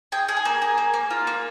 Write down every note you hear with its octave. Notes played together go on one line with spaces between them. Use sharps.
G#4 G5
G#4
G#5
A#3
G#4
A#3
A#3
F4
A#3